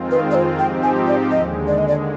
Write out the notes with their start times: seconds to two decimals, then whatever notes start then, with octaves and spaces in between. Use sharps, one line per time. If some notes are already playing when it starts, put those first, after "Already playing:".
Already playing: F2 D#3 G#3 C4 F4
0.11 B4
0.31 D5
0.35 C5
0.59 G#2 F3 C4 D#4 G4 G5
0.83 G#5
1.08 D5
1.31 D#2 D3 G#3 D#5
1.67 D5
1.78 D#5
1.88 D5